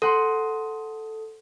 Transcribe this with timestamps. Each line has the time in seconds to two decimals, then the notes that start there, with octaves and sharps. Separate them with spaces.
0.02 A4 C5 F#5 C6